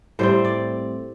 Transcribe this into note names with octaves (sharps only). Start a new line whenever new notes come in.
A2 G3 C4 C5
D5